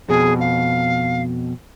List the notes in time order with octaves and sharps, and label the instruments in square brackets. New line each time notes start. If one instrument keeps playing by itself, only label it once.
[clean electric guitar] F2 B2 [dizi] G#4
[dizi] F5